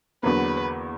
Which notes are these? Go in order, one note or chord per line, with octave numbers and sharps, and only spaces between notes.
E2 D3 F#3 A#3 B4